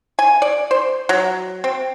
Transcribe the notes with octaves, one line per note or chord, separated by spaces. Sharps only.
G#5
D5
C5
F#3
C4